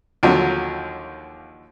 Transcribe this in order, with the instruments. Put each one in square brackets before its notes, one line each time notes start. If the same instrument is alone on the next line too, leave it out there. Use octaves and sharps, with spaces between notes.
[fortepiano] D#2 D3 F3 F#3